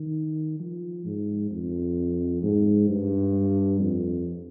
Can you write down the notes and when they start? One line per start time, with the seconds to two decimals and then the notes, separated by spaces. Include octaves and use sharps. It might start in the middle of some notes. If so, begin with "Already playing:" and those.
Already playing: D#3
0.60 F3
1.05 G#2
1.51 F2
2.43 G#2
2.89 G2
3.80 F2